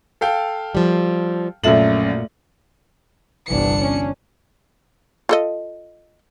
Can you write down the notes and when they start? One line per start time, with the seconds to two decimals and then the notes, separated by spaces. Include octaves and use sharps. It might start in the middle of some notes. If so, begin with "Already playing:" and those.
0.21 A4 F5 G5
0.75 F3 G3
1.64 A#1 F#2 A#2 A3 A4 E5 F#7
3.47 G1 C2 E3 D4 C#7
3.80 C#4
5.29 F4 A4 D#5